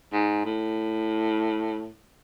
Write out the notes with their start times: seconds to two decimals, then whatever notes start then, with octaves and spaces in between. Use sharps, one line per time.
0.13 G#2
0.45 A2